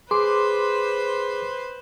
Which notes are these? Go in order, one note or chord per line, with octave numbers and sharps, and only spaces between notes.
G#4 B4 C5 C6 D6